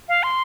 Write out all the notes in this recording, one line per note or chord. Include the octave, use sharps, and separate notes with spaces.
F5
C6